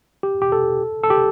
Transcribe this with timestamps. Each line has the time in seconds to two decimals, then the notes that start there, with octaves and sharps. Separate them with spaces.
0.23 G4
0.42 G4
0.52 A4
1.03 A4
1.10 G4